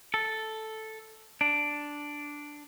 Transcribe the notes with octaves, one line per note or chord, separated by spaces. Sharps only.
A4
D4